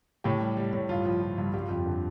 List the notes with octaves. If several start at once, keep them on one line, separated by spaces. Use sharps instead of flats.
A2 G4
G3
G3
A2
G2 F4
F3
F3
G2
G3 G4
F4
F2 G4
D3